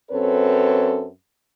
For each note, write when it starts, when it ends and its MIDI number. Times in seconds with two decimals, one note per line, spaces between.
0.10 1.06 42
0.10 1.06 60
0.10 1.06 69
0.10 1.06 71
0.10 1.06 73